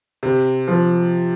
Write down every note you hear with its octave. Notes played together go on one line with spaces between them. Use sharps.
C3
F3